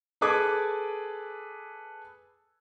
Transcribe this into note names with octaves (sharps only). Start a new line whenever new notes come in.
G#4 A4 B4 D6 D#6 G#6